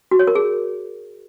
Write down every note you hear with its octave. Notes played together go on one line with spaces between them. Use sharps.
F#4
C#5
A#4
G#4